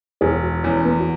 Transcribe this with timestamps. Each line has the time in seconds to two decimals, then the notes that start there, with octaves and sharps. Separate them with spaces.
0.21 E1 G#4
0.43 F#4
0.63 E2 C#4
0.85 B3
1.00 F#4